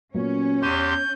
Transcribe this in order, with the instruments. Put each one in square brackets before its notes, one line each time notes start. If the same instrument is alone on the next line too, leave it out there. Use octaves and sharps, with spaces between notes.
[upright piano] A#2 F#3 B3 [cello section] C#4 C#5
[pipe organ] E2 G4 C6 [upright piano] C#6 D#7 [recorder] G6